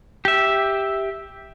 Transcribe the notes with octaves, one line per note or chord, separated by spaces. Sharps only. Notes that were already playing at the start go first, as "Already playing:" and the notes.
G4 E5